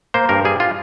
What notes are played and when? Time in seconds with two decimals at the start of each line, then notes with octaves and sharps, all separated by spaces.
0.14 A#3 C5
0.29 G2 A#4
0.45 G3 G#4
0.60 F4